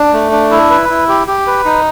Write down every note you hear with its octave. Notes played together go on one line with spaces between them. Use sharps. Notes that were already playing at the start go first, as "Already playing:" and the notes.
Already playing: D4
A3
D4
E4
B4
E4
G4
G4
B4
D#4